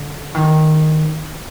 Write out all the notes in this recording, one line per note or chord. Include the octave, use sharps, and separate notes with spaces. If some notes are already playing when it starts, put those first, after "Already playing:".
Already playing: D3
D#3